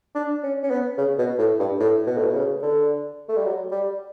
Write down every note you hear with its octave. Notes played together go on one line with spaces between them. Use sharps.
D4
C#4
C#4
B3
C#3
B2
A2
G2
A2
B2
A2
B2
C#3
D3
A3
G3
F#3
G3